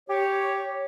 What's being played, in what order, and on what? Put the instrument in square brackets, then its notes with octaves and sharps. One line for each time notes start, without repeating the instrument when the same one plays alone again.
[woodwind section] G4 C#5